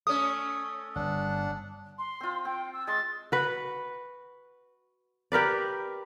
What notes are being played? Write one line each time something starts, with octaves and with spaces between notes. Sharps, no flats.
A3 C#4 D#6
G1 D4 F#5
C6
C4 F4
C4 G5
E6
G#3 C6 A6
F#4 B4
G4 A#4 B4 D5